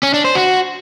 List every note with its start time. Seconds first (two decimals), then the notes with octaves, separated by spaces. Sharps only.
0.03 C#4
0.14 D4
0.25 C5
0.35 F#4